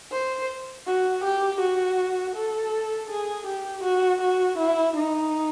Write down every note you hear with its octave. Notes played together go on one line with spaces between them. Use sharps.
C5
F#4
G4
F#4
A4
G#4
G4
F#4
F#4
E4
D#4